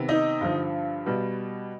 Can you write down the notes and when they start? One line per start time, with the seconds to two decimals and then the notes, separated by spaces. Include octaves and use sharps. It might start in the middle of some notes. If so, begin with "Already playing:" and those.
Already playing: C3 D#3 B3
0.09 D#4 D#5
0.41 G2 D3 F3
1.06 B2 G3 B3